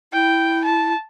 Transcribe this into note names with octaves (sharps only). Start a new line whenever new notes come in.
E4 G5
A5